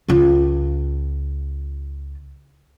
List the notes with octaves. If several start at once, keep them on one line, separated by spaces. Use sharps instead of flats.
C#2 F4